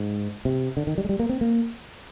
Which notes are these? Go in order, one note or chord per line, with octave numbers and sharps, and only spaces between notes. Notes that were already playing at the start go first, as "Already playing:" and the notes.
Already playing: G#2
C3
D3
D#3
G3
G#3
G3
A#3
C4
A#3